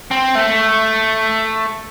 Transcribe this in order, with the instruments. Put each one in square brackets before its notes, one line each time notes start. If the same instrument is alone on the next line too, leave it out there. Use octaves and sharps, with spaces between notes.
[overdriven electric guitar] C4
A3